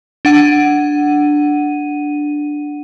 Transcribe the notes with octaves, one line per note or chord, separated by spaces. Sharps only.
D4 F#5 D#7